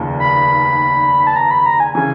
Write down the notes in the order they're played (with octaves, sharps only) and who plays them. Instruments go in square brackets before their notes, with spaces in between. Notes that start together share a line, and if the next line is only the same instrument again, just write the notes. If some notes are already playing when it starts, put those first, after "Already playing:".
Already playing: [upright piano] F1 D#2 C#3 F3 A#3
[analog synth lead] B5
A5
A#5
B5
A#5
G#5
[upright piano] C#3 E3 [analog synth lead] G#5